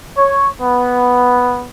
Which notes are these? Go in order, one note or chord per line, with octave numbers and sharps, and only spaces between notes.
C#5
B3